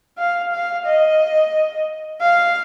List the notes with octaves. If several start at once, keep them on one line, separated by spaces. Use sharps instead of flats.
F5
F5
D#5
F5